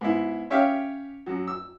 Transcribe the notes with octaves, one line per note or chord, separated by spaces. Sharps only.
G#2 B3 E4
C#4 G4 C#5 E5 F5 G5
F#2 F#3
E6